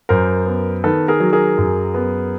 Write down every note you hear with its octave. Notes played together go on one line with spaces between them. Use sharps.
F#2 A#4 C5
B3
D#3 A4 B4
G#4 A#4
F#3
G#4 A#4
F#2
B3